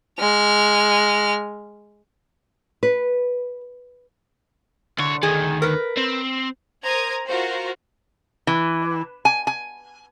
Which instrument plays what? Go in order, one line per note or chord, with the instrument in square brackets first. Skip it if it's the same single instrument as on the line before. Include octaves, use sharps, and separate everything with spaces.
[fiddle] G#3 F6
[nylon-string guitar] B4
[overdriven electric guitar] C2 C#5 [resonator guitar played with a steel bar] D3
[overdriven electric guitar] D2 D#3 [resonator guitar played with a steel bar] G#4
[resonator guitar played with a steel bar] A#4 B4
[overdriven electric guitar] C4
[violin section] A#4 C5 A#5 D#6 G#6
F4 F#4 A#4 C5
[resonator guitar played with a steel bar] E3
G#5
G#5